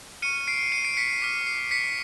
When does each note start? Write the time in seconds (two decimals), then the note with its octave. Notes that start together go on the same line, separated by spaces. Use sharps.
0.22 C#6 F6 C#7 D#7
0.48 C7 D7
0.72 C#7 D#7
0.85 C7 D7
0.97 B6 C#7
1.09 C7
1.22 D6 F6 B6
1.47 C7
1.71 B6 C#7